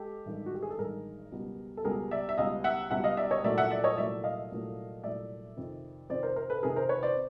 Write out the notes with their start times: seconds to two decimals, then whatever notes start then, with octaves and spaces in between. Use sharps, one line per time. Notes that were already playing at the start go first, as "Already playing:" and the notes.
Already playing: G#3 G4 A4
0.25 A1 G2 D#3 G#3
0.46 F#4
0.55 G4
0.62 G#4
0.70 A4
0.79 A1 G2 D#3 G#3 G#4 A#4
1.32 C#2 B2 G3
1.77 A4
1.85 C#2 B2 G3 G#4 A#4
2.11 D5 E5
2.29 E5
2.38 C#2 B2 G3 D#5 F5
2.64 E5 F#5
2.91 C#2 B2 G3 E5 F#5
3.04 D#5 F5
3.17 D5 E5
3.31 C#5 D#5
3.44 C2 A#2 F#3 A3 D5 E5
3.58 E5 F#5
3.71 D5 E5
3.84 C#5 D#5
3.97 C2 A#2 F#3 A3 D5 E5
4.24 D#5 F5
4.50 C2 A#2 F#3 A3
5.04 C2 A#2 F#3 A3 D5 E5
5.57 F2 C3 D#3
6.09 F2 C3 D#3 C5 D5
6.23 A#4 C5
6.36 A#4 C5
6.50 A4 B4
6.63 F2 C3 D#3 G#4 A#4
6.76 A#4 C5
6.89 B4 C#5
7.03 C5 D5